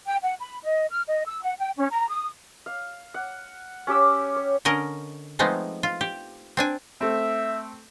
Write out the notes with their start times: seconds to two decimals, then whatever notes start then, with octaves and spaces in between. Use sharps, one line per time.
0.06 G5
0.23 F#5
0.40 B5
0.63 D#5
0.90 F6
1.08 D#5
1.26 E6
1.42 F#5
1.59 G5
1.77 C#4
1.91 A#5
2.10 D#6
2.66 F5
3.14 F#5
3.87 C#4 G4 D6 E6
4.36 C#5
4.65 D3 C#4 A#4 D#5
5.39 F3 G#3 A3 B3 C4 D#4
5.83 F4
6.01 G4
6.57 C4 D4 G#5
7.01 A3 C4 E5